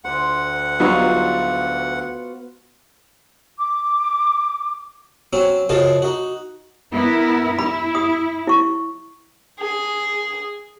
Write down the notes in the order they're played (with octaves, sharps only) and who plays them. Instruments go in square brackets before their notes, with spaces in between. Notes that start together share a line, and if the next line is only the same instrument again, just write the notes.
[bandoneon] D2 F#5 [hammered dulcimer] C5
[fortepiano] F#3 G3 D#4 [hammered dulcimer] B3 F4 F#4
[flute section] D6
[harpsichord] F#3 C4 C#4
F#2 C#3 F3 F4 D#5 A5
D#4 F#4
[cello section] B3 E4 A#4
[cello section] E4 [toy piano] B5
[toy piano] D#6
E4 C#6
[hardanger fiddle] G#4